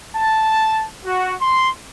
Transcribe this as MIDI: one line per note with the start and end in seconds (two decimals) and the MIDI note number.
0.16 0.87 81
1.06 1.34 66
1.41 1.71 84